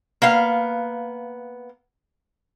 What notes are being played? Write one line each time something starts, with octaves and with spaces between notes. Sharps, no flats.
A#3 B3 F5